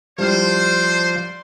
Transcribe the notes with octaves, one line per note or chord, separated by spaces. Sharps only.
F3 G3 E4 C5 D5 C6 F6